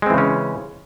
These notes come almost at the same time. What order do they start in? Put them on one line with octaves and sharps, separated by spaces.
G#3 C4 E3 C#3 C#4